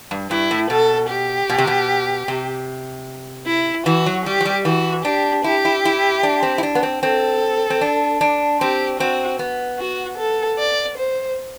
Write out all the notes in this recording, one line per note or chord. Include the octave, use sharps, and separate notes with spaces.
G2
G2 E4
A2
B2 A4
G4
B2
C3
B2
C3
E4
E3 F#4
F#3
G3 G4
F#3
G3
E3 F#4
D4 G4
E4 G4
E4
E4
D4
C4
E4
D4
B3
C4
C4 A4
C4
D4
D4
C4 G4
C4 F#4
B3
F#4
A4
D5
C5